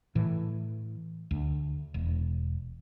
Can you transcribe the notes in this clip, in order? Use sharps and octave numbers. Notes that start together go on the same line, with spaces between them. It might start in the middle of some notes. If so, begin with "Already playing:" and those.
A2 E3
D2
E1